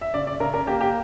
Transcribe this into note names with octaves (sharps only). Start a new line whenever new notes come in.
E5
C#3 D5
D5
C#3 A#4
A#4
A#3 G4
G4